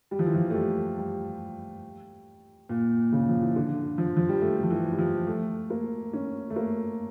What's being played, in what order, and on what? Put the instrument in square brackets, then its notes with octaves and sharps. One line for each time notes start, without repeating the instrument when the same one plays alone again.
[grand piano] G3
F3
E3
F3
A3
G3
G3
A#2
C#3
F3
E3
D3
F3
F3
G3
A3
F3
E3
G3
F3
A3
A#3
C#4
A3
A#3